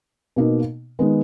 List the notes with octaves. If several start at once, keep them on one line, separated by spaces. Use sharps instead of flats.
B2 A#3 D#4
D#3 G#3 B3